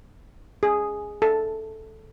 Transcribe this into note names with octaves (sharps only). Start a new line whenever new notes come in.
G#4
A4